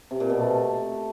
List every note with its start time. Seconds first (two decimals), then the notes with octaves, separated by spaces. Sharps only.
0.11 C3
0.20 A#2
0.30 B2
0.39 A3